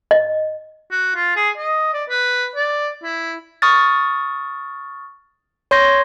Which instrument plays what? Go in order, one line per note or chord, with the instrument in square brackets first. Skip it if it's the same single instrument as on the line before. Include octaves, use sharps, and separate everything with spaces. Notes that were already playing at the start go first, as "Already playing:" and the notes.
[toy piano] D#5
[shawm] F#4
F4
G#4
D#5
D5
B4
D5
E4
[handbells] C#6 D#6 F6 A6
C#5 C6 G6 A#6